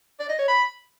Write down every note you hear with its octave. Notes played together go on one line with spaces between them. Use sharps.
D5
D#5
C#5
B5